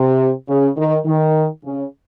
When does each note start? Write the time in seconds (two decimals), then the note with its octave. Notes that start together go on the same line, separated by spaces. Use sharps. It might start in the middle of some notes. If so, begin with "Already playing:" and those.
Already playing: C3
0.48 C#3
0.77 D#3
1.06 D#3
1.64 C#3